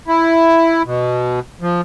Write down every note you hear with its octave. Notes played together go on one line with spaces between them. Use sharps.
E4
B2
F3